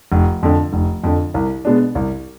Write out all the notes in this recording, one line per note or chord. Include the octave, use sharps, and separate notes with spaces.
F1
F2 D3
F1
F2 D3
C2
B2 G#3 B3 D4
C2